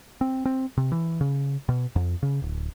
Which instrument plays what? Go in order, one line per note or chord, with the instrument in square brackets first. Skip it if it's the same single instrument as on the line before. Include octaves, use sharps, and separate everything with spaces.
[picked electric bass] C4
C4
C3
E3
C#3
B2
F2
C#3
D1